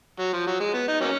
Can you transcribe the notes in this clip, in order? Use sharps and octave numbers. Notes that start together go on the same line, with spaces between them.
F#3
F3
F#3
G#3
B3
D#4
F#3 A#3 C#4